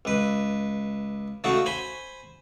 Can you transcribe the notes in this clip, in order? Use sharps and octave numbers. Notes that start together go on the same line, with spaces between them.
C#2 B4
C#3 A3 D#4 F#4
C5 G#5 B5 C6